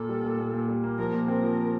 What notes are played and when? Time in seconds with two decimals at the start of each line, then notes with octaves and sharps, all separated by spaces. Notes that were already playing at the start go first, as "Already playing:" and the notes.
Already playing: A#2 A#3 A4
0.09 G3
0.24 A#2
0.38 A#2
0.54 A#2
0.68 G3
0.84 A#3
0.98 F3 A#4
1.13 A#2
1.28 C4 A#4
1.43 F3